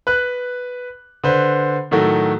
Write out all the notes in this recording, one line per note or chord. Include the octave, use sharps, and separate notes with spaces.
B4 F#6
D3 B4 C5
A2 D#3 F#3 A3 F#4